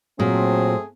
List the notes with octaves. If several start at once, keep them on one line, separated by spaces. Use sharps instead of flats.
A#2 F#3 A3 C4 G#4